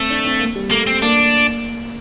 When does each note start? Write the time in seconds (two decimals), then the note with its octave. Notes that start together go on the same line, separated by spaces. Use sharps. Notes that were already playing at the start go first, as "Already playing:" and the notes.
Already playing: A3 C4
0.09 D4
0.25 C4
0.39 A#3
0.55 G3
0.71 A3 A#3
0.87 C4
1.02 A#3 D4